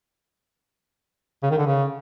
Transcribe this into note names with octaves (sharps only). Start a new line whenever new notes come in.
C#3
D#3
D3
C#3